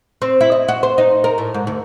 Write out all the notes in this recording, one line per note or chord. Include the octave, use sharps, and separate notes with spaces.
C4
E4
D#5
F#4
C5
D#4
A#4
A2
G#2
D2